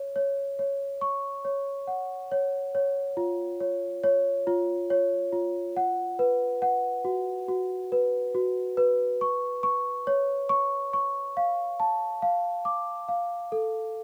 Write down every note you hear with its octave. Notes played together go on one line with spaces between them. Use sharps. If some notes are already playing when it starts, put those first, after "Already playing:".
Already playing: C#5
C#5
C#5
C#6
C#5
F#5
C#5
C#5
F4
C#5
C#5
F4
C#5
F4
F#5
B4
F#5
F#4
F#4
B4
F#4
B4
C#6
C#6
C#5
C#6
C#6
F5
A5
F5
D6
F5
A4